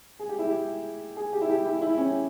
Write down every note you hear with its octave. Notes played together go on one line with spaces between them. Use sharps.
G#4
G4
E4
G4
G#4
G4
E4
G4
E4
E4
C#4